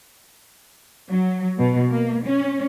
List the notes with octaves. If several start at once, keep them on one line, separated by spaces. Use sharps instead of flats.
F#3
B2
A#3
C#4